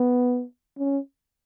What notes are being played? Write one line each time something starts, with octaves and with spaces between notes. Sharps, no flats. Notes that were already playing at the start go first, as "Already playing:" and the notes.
Already playing: B3
C#4